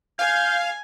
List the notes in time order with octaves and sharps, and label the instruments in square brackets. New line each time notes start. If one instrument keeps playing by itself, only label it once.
[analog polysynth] F5 [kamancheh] G#5 [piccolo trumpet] G6